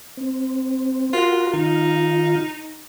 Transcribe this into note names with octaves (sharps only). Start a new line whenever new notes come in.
C4
F4 F#4 A#4
D#3 D#4 F4